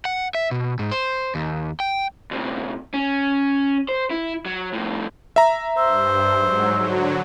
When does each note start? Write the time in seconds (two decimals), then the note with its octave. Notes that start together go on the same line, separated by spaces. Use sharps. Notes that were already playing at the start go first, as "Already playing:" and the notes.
0.05 F#5
0.35 E5
0.51 B2
0.79 G#2
0.91 C5
1.35 D#2
1.80 G5
2.31 D2 C3
2.94 C#4
3.89 C5
4.10 E4
4.46 F#3
4.73 F2 A2
5.36 E5 A#5
5.77 G2 C5 E6
6.35 G#2 F#3
6.79 D3 F#3